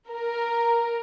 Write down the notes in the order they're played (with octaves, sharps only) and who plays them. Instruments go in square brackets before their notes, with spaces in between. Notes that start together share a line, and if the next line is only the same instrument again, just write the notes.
[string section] A#4